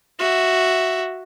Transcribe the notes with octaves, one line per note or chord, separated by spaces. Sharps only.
F#4 E5